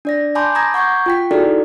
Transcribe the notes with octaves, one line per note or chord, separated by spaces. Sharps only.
D4 D5 A#6
G#5 A5 B5 C6 D6 G6
A#5 D6 D#6 G#6 A#6
F#5 C#6 G6 G#6
F4 G5 B6
D#4 E4 F#4 G#4 A4 D5